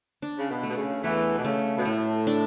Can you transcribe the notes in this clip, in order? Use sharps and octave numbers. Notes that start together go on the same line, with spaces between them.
D4
C#3
B2
A3
B2
C#3
E2 E3 A3
B2
C#3 A3
B2
A2 A3
D4